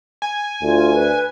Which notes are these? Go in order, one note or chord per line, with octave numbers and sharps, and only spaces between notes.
G#5
D2 F4
B4